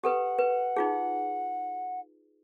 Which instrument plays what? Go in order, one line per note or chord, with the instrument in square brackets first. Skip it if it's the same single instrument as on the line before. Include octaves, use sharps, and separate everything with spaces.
[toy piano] G4 A4 B4 [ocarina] F#5
[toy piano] B4
D#4 F4 G#4